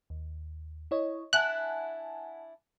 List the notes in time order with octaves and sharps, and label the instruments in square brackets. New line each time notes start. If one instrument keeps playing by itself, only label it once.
[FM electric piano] D#2
E4 C#5 D#5
[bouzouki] D4 E4 [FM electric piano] F#5 G#5 A5 [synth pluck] F#6